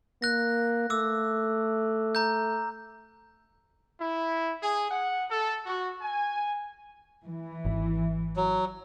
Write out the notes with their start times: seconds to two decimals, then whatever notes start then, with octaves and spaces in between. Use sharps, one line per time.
0.22 A#3 F#6 A#6
0.90 A3 D6 E6
2.15 A#5 G6
4.00 E4
4.62 G#4
4.91 F#5
5.29 A4
5.65 F#4
6.01 G#5
7.24 E3
7.65 G#1
8.36 F#3